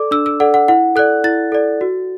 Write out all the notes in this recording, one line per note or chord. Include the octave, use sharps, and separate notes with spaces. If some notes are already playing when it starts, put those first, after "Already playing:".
Already playing: A4 D5 D6
D4 E6
E6
A4 D5 F#5
F#5
E4 F#5
A4 D5 F#6
E4 A6
A4 D5
F#4